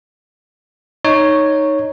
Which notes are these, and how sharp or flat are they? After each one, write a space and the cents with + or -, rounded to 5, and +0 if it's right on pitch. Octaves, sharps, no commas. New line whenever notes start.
D#4 +0 C#5 +0